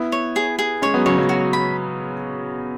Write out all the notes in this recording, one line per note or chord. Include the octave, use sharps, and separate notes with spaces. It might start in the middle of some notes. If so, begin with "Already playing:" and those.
Already playing: B3 E4
C#5
G#4
G#4
G#3 C#4 C#5
F#3 B3
C#3 F#3 C#5
C#3 F#3
F#4
B5